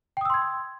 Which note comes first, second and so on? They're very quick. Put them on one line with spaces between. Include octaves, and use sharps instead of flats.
G5 D#6 E6 C6 G#6